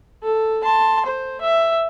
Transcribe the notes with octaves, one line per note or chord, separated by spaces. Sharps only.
A4
A5 C6
C5
E5